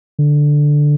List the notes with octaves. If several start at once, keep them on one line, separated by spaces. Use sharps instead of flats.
D3